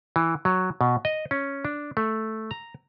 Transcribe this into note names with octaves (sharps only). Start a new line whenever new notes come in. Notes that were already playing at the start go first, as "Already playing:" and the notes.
E3
F#3
B2
D#5
C#4
D4
A3
A#5